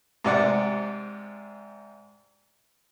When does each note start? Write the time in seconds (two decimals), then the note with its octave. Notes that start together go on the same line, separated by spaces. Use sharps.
0.25 G#2 C3 D5 F#5